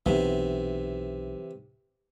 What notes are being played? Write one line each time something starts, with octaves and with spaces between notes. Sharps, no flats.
B1 C3 E3